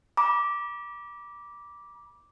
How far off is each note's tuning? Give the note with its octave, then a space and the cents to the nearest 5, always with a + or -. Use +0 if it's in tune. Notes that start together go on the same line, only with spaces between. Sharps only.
B5 -40 D6 -5